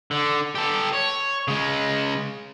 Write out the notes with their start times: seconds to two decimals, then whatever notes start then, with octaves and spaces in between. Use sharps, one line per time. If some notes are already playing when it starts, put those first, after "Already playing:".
0.11 D3
0.55 G4 A4
0.93 C#5
1.48 C#3 G#3